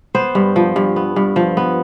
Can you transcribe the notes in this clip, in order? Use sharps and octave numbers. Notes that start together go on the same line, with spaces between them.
B3 C5
G2
F3
G2
B3
G2
F3
B3